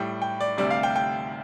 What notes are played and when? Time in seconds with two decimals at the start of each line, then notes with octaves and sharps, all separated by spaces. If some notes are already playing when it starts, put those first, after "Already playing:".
Already playing: A2 G3 G5
0.22 G5
0.41 D5
0.58 D2 C3 G3 D5
0.71 F5
0.83 G5
0.96 G5